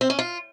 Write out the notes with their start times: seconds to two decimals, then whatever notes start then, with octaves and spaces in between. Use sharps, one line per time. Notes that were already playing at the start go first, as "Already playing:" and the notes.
0.01 C4
0.10 C#4
0.19 F4